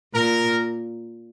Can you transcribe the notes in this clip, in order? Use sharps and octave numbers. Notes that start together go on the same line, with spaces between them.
A#2 A#4